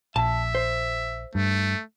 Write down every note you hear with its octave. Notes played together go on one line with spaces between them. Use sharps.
A#1 E5 A5
C5
G2 A3